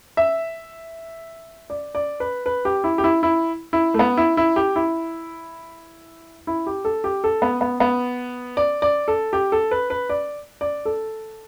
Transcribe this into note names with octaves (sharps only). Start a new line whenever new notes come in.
E5
D5
D5
B4
B4
G4
E4
G4
E4
E4
E4
A3
B3
E4
E4
G4
E4
E4
G4
A4
G4
A4
B3
B3
B3
D5
D5
A4
G4
A4
B4
B4
D5
D5
A4